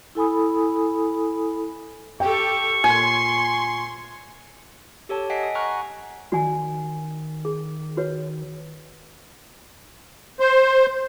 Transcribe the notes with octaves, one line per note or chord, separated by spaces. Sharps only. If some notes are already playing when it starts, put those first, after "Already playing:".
E4 A4 G#5 B5 D#6
G4 A4 G5 C#6
A#2 G#5 C6
G4 A4 C#5 A5
D#5 F#5 G#5 B6 C7 D7
D#6
F#5 G#5 A#5 C#6 F6 F#6
D#3 F#4 D5 G#5
G#4
F#4 B4 C#5
C5